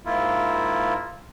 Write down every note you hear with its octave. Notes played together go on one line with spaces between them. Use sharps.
G#2 A#3 E4 F4